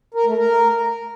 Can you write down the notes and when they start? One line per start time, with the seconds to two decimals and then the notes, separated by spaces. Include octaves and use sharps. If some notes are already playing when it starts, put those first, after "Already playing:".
0.14 A#4
0.26 A3
0.37 A#4